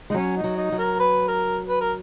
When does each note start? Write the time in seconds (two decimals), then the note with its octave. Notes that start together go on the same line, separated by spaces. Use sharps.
0.10 G#3 D#4
0.14 F#3 C#4
0.36 D#4
0.44 F#3
0.57 D#4
0.72 F#3
0.78 A#4
1.00 B4
1.28 A#4
1.68 B4
1.81 A#4